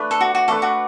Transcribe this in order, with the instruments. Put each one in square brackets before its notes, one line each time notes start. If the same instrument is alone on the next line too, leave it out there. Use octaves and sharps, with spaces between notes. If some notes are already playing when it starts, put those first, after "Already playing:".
Already playing: [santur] A3 D4 B4
[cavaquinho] A4
F#4
F#4
[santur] A3 D4 B4 [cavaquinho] A4
[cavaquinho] F#4